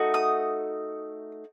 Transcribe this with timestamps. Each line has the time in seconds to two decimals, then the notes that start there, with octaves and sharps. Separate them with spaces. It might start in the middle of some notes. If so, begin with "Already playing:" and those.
Already playing: A3 D#4 F#4
0.14 D#6